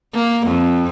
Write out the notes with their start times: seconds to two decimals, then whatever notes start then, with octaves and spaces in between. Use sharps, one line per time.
0.14 A#3
0.47 F2